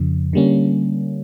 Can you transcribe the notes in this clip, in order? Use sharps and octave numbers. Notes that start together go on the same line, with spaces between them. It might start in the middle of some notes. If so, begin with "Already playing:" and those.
Already playing: F2 C#3 F3
D3 G3 A#3 C#4